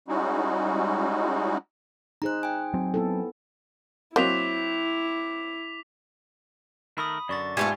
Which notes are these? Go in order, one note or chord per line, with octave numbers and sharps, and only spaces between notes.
G3 G#3 C#4 D#4 E4 F#4
D#4 G#4 C5 A#5 F#6
G5 G#5
F#3 C4
B3 E4 A4
F#3 A#3 C4 E4 D#5 D6 B6 F7
D#3 A3 A#4 B5 D#6
F#2 D3 D5 C#6 A6
G#2 A3 B3 F4 G4 G#5